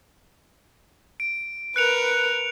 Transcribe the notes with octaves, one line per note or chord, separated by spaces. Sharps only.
D7
A#4 B4 F#6 C#7 F7